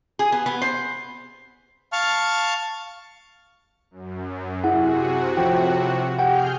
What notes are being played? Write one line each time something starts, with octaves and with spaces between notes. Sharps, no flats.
G#4
B3
B3
C5
F5 A5 C#6 F6
F#2
C3 E4 F#4 G#4 F#5
A2 F3 G5
G4 G#4 F#5 G5 F6 G6